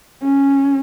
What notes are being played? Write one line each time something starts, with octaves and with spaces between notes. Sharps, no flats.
C#4